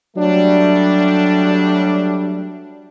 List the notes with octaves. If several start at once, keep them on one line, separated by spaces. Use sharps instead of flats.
F#3 G3 A3 D4